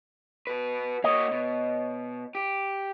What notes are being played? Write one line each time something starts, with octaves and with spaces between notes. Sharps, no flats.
F#4 B4
A#3 F#4 C#5 D#5
B2
G4